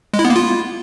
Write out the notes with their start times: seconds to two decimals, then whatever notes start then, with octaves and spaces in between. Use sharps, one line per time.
0.14 G#3
0.19 E4
0.25 B3
0.30 A#3
0.36 F4